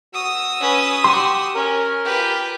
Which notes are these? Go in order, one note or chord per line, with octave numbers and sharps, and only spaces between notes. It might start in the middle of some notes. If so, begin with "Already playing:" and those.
F#4 D#6 E6
C#4 B4
F#4 G4 C6
C#4 A#4
F4 G4 B4